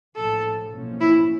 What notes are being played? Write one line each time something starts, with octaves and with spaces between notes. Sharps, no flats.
A#1 A2 F3 A4
B1 A2 F3 A#3 C#4
E4